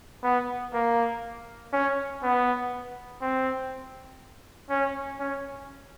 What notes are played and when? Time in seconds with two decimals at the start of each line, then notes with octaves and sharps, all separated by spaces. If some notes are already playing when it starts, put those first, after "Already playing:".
0.24 B3
0.74 A#3
1.73 C#4
2.23 B3
3.21 C4
4.70 C#4
5.20 C#4